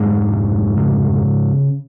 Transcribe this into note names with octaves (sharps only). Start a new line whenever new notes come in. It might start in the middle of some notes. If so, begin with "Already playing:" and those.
Already playing: F1 G#2 G#3
F1
C#3